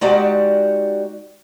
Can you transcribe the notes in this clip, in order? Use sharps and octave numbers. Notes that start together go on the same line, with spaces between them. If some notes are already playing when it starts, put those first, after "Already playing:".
G#3 D#4 F#4 G4 D5 F#5